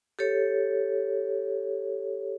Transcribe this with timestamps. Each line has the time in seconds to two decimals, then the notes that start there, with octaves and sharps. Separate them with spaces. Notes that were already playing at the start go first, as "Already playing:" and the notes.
0.19 G4 A4 C#5